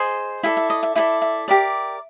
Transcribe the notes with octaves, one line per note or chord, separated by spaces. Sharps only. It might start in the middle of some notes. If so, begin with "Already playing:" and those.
Already playing: G#4 C5 D#5
E4 A4 D5 E5
E5
D#5
E5
E4 A4 D5 E5
E5
G4 A#4 D5